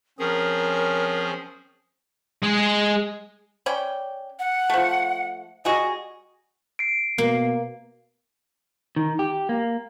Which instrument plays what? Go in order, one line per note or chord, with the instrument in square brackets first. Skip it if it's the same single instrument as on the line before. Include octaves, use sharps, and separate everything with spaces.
[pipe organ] F3 G#4 [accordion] C4 C#4 [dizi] A#4
[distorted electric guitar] G#3 G#4
[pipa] C#4 D5 G5
[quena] F#5
[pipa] F3 A3
[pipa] G3 F#4 G#4 [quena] D#5
[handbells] C7 D7
[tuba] B2 [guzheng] A#3
[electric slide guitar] D#3
G4
A#3